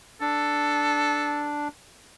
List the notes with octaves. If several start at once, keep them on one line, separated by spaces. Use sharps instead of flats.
D4 A4